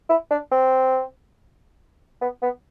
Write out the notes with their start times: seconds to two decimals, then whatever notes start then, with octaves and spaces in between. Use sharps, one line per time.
0.09 E4
0.31 D4
0.52 C4
2.21 B3
2.42 B3